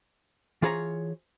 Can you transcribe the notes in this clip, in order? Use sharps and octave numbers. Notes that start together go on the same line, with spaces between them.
E3 F4 G#4 C#5 A5 A#5